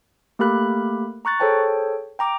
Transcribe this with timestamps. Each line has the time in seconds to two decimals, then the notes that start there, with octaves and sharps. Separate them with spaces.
0.39 A3 A#3 G4 A#4 B5 F#6
1.25 A#5 C#6 F#6 A6
1.40 G#4 A4 C5 C#5 G5 A5
2.19 G5 A#5 D6